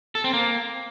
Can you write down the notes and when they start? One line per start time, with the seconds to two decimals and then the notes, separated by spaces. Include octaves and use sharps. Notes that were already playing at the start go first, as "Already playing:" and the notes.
0.15 A4
0.24 C4
0.33 A#3